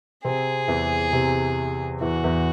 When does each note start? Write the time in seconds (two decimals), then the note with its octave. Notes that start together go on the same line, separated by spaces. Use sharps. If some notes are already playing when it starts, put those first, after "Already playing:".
0.24 C3 C4 G#4
0.68 E2 E3
1.13 C3
2.01 E2 E3 F#4
2.24 E2 E3